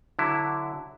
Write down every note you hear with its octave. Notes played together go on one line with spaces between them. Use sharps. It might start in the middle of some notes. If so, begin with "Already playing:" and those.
D3 F#3 E4